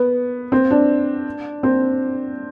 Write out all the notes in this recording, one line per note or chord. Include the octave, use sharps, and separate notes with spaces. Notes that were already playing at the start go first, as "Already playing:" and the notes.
Already playing: B3
C4
D4
C4